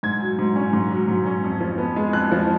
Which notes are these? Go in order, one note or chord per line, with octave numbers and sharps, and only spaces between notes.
G#2 G#6
F#3
G#2
C#4
G#2
F#3
G#2
C#4
F2
F3
B3
G#3
F2 F#6
F3